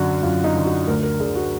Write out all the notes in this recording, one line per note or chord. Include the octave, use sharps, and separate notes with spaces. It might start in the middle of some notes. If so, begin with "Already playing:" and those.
Already playing: F#2 D3 F#4
F#2 F4
D#4
D3
F#4
D2 A#4
A#4
D3 G#4
F#4